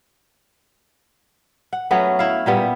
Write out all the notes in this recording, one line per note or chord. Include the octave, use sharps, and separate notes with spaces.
F#5
F#3 A3 B3 C#4
E4 F5
A#2 G3 B3